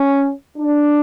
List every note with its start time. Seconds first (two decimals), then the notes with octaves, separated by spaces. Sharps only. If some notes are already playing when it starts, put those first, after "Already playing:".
Already playing: C#4
0.57 D4